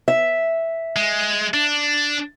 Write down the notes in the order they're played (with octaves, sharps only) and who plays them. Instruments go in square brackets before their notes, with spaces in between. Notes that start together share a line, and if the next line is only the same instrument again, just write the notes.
[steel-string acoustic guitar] E5
[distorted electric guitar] G#3
D4